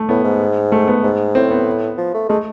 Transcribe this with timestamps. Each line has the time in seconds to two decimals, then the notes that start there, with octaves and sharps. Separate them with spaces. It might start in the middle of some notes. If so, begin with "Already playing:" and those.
Already playing: A3
0.09 A2 B3
0.24 G#2
0.72 A3
0.87 B3
1.03 G#2
1.35 A2 C4
1.51 B3
1.97 F3
2.14 A3
2.29 G#3 A3